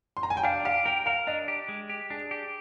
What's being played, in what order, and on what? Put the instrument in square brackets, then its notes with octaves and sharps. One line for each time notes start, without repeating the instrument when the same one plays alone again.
[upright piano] C6
A#5
G#5
G5
[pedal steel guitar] D4 [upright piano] F5
[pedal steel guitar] G4 [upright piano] F5
[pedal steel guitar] A#4 [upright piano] G5
[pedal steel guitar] A#4 [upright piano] F5
[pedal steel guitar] D4 [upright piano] D#5
[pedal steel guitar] G4
G#3
G4
[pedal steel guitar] D4 [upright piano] G#4
[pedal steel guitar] G4